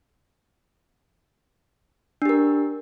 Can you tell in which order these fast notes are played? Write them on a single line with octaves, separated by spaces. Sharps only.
D4 G4 A#4